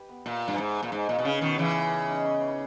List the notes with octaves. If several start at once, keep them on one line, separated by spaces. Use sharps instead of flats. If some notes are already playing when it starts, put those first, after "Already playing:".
Already playing: G4 B4
B3
A#2 E5
G2 E5
G#2 B4
B4
A#2
G#2 D#4
A#2 G#4
B2
C#3 B4
B2 D#3 B3
C#3 E3 G#4
C#5
E5
D#4
C#4
C#4